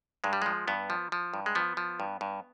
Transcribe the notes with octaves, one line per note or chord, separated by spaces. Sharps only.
G2 G#3
G3
F3 G#3
G2 B3
F3
F3
G2
G#3
F3 B3
F3
G2
G2